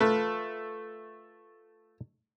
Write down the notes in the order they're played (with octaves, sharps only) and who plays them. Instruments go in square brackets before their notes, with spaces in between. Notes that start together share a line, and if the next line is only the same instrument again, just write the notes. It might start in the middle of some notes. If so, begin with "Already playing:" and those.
[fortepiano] A3 [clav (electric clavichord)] F4 A4 B4